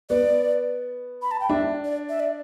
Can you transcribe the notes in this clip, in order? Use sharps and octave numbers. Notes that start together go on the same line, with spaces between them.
B3 D5
B5
A5
G5
D4 E5
D5
E5
D5